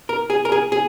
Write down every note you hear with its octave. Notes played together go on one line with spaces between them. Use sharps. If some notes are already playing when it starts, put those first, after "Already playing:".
A#4
G#4
A#4
G#4
G#4